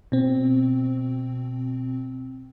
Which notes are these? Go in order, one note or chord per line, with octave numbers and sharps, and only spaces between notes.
B2 C4